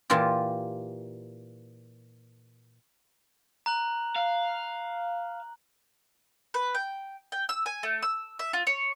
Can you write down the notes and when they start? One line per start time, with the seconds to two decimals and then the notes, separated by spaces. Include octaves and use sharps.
0.10 A#2 E3 F4 G4
3.66 A#5 F#6 F#7
4.16 F5
6.54 B4
6.74 G5
7.32 G5
7.49 E6
7.66 G#5
7.83 A3
8.03 E6
8.39 E5
8.53 F4
8.67 C#5